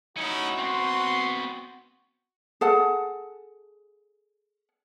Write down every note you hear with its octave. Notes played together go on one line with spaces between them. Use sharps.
C#4 D#4 E4 F#4
B3 C4 C6
G#4 A4 F#5